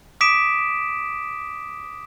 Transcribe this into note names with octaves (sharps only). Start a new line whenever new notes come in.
D6 D#6 B6 D7 E7